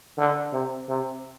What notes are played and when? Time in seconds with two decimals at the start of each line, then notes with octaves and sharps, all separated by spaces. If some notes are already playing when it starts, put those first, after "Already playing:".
0.18 D3
0.53 C3
0.89 C3